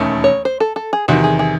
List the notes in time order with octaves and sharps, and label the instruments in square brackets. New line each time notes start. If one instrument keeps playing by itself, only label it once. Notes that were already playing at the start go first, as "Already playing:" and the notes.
Already playing: [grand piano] E1 D#2 D#3 A3 C#4
[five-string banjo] C#5
C5
A4
A4
G#4
[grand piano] E2 C3 D#3 [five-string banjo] F#4
[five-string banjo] G#4
G#4